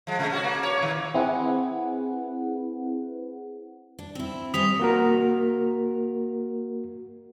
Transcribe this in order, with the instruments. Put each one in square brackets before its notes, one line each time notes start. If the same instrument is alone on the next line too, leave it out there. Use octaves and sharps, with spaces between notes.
[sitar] F3 G#3
C3 G#3 A3
C#4 F#4
A#3
C#5
A#2 D#3
[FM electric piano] C4 E4 G#4 B4 F#5
[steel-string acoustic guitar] D4
C4 E4
[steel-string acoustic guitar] G3 C4 C#4 [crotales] D#6 B6 F7
[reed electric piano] A#3 F#4 A#4